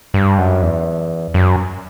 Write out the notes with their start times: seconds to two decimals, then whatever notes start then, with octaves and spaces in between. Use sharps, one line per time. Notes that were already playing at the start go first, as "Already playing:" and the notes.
0.14 G2
0.38 F#2
0.62 E2
1.34 F#2